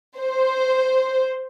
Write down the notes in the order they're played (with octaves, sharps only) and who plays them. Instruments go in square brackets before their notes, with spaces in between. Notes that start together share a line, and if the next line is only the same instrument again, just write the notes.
[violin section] C5